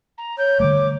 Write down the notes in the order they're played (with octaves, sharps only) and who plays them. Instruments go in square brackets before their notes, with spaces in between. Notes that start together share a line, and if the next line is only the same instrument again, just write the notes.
[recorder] A#5
[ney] C#5 [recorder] G6
[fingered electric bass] D3 G3 A3 [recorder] D6